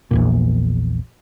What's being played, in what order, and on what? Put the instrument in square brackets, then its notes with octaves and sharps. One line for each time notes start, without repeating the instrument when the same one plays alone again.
[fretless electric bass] A#1 E2 A#2